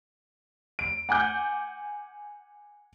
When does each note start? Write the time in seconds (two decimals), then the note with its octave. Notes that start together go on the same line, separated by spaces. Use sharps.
0.79 D7
1.09 F#5 G#5 D6 G6